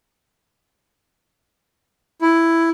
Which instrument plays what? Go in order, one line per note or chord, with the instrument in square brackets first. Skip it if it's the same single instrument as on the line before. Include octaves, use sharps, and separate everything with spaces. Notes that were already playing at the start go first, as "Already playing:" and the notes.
[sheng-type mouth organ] E4